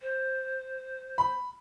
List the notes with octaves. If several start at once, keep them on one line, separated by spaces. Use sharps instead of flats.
C5
B5